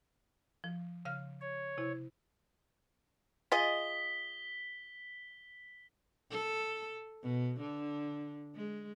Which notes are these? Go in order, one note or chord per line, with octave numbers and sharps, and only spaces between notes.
F3
C#3 F5 F6
C#5
C3 E4
F4 G#4 D#5 B6 G7
A4
B2
D3
G#3